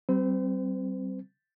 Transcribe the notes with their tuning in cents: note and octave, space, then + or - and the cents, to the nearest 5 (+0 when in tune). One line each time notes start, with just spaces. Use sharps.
G3 -30 C4 +0 C5 -40